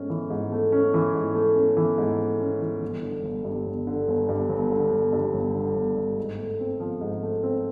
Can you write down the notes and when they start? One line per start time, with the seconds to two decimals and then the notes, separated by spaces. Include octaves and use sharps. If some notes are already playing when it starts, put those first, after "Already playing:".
Already playing: G#2 A3 C#4
0.10 E3
0.30 G#2
0.52 A3
0.72 C#4
0.94 E3
1.15 G#2
1.35 A3
1.56 C#4
1.77 E3
1.98 G#2
2.20 A3
2.40 C#4
2.62 E3
2.82 G1
3.03 D3
3.23 G1
3.45 G2
3.66 G1
3.87 D3
4.08 G1
4.29 G2
4.49 G1
4.71 D3
4.91 G1
5.13 G2
5.34 G1
5.55 D3
5.75 G1
5.97 G2
6.18 G#2
6.38 A3
6.60 C4
6.80 F3
7.01 G#2
7.23 A3
7.43 C4